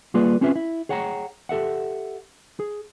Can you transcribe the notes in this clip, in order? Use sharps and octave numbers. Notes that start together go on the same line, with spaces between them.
G3 A#3 F4 G#4 B4 D5
C4 C#4 F4 G#4 B4 E5
E4
G#4 C#5 F#5 G5 A5 A#5
G4 A4 E5 F#5
G#4